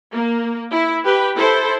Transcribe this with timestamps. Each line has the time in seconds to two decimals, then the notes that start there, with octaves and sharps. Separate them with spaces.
0.12 A#3
0.72 E4
1.04 G4 B4 G5
1.36 E4 A4 C5